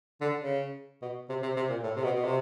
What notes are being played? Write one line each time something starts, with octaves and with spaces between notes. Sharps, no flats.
D3
C#3
B2
C3
C3
C3
A#2
A2
C3
B2
B2
C3